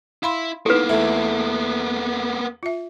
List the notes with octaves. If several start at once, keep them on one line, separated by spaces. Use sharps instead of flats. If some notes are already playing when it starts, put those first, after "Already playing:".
E4 F5 B5 C6
A#3 B3 D#4 E4 A4 B4
E2 A3 E4 E5
F4 E5